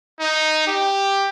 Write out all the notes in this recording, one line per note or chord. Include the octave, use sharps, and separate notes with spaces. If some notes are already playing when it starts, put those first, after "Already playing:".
D#4
G4